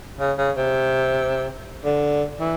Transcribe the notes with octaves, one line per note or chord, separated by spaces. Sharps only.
C#3
C#3
C3
D3
E3